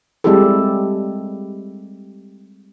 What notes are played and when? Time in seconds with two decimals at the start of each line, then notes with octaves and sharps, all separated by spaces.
0.24 G3 G#3 C4 E4 G4 A4